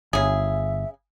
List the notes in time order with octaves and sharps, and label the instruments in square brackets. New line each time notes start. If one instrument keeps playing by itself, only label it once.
[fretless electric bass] G1 [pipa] C#3 G#4 [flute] E5